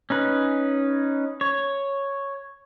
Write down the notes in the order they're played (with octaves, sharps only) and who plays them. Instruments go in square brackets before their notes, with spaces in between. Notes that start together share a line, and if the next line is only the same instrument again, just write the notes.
[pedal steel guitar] C#4 D#4 B4
C#5